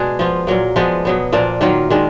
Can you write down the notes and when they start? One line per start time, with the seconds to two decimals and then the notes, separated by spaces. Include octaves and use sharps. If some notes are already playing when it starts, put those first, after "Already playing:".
Already playing: B2 G#3 D4 G#4
0.19 F3 B3 F4
0.47 A#2 F#3 A#3
0.76 F3 G#3 B3 D4
1.05 B2 F#3 B3
1.32 A#2 F3 A#3 D4
1.61 D#3 F#3 A#3 F4
1.90 D#3 G#3 D4